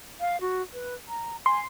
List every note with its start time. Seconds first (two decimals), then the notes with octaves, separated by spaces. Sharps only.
0.20 F5
0.41 F#4
0.73 B4
1.08 A#5
1.46 G#5 C6